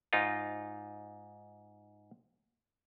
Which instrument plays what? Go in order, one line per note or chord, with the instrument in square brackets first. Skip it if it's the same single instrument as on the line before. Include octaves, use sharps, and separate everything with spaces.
[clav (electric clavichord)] G#2 D#4 F4